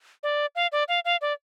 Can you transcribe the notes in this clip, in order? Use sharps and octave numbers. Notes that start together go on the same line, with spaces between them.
D5
F5
D5
F5
F5
D5